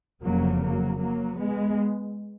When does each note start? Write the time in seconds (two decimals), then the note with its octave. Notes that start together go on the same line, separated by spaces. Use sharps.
0.22 F1 F2 C#3 F#3 A#3
0.60 F#3 A#3
0.99 F#3 A#3
1.38 G#3 B3